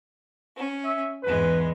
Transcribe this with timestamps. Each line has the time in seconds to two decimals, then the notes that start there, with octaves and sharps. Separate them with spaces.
0.56 C#4
0.85 E5
1.23 E2 G#2 G#3 B4